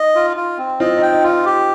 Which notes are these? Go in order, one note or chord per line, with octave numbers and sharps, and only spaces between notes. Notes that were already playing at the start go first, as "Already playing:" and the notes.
Already playing: D#4 D#5
F4
F4
C4
C4 F4 D#5
D#4
G5
D#4
D#4 F4
G4